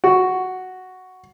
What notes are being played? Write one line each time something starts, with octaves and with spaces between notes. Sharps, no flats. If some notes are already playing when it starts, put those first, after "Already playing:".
F#4